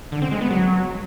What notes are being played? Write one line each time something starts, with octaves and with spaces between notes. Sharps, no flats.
D3
C4
G#3
B3
F#3